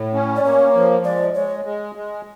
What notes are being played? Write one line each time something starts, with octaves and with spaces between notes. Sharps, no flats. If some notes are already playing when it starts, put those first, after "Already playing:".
Already playing: A2
C#4
D5
A#3 C#5
F3
G#3 D5
G#3 C#5
G#3
G#3